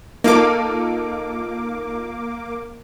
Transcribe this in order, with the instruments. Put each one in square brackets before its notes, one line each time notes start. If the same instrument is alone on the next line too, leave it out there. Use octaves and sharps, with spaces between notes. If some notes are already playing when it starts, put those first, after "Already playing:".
[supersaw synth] A#3 D6 [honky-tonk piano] D#4 F4 A4